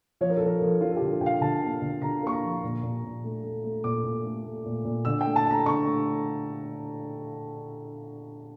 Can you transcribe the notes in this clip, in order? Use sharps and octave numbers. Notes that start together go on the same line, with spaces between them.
F3 C#5
A#4
F3 A4
A#4
F3
F3 F4
A4
D3 G4
A4
D3 G5
F5
D3 A5
A#3
D3
D3 A#5
A#3 C#6
A#5
F3
A#2
A#2
A#2
A3
A3
A3
A#2 D6
A#2
A3
A3
A#2
A#2
D3 E6
G5
A3
A5
D3 A#5
D3 C#6
A3